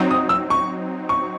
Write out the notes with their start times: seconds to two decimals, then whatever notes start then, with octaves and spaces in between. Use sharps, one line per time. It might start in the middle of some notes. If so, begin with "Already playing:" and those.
Already playing: F#3 C4 D#4
0.11 D#6
0.29 E6
0.50 C#6
1.09 C#6